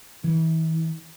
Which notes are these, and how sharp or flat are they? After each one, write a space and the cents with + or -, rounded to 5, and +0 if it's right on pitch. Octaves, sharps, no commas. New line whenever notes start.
E3 -35